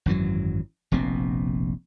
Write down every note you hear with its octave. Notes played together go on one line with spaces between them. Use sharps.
G#1 F#2 E3 F#3
F1 A#1 B2 C4